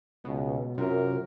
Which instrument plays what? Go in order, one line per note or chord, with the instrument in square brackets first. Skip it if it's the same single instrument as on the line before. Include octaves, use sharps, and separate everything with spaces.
[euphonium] C#2 [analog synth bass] B2
[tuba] F#2 [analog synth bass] C3 [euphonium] F4 [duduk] A#4